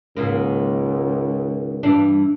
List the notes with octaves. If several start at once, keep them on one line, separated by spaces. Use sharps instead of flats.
C#2 G#2 D#3 A#3
G2 E3 D4